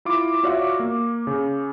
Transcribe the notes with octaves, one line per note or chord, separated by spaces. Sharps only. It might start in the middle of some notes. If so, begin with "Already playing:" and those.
E4 F4 D6
F4 F#4 C#5 D5 E5 F5
A#3
C#3